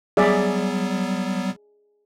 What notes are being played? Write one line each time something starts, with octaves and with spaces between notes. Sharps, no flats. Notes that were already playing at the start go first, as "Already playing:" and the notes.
F#3 G3 B3 G#4 D5 E5